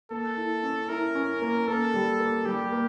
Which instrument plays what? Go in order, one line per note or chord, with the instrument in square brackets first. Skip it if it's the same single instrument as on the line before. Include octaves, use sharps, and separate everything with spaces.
[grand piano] A#3 [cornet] A4
[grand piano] E4
C#4
[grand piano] E4 [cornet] A#4
[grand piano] C#4
A#3
[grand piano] A#3 [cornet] A4
[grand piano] G3
A#3
[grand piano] G3 [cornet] G4
[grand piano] A#3